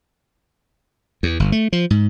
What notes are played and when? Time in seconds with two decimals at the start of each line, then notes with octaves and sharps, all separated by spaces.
1.23 E2
1.40 G1
1.52 A3
1.73 F3
1.90 G#2